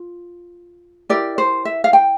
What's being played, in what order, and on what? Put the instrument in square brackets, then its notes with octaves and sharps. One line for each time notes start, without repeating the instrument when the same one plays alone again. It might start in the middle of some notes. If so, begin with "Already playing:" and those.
Already playing: [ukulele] F4
E4 G4 A#4 D5
C5
E5
F5
G5